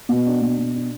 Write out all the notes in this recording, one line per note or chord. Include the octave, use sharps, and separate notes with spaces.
B2
D4
B2
B2
D4